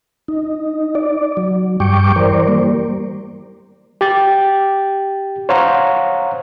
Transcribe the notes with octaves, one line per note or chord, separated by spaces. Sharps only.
D#4
D5
F#3
G2 G3 G5 C#6 D6
E3 A#4 C5 D5
G3 A#3
G4 G5 A6
C5 C#5 F5 F#5 A#5